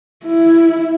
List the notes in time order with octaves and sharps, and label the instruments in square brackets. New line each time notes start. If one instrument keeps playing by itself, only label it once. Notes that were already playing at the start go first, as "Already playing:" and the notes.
[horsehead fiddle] E4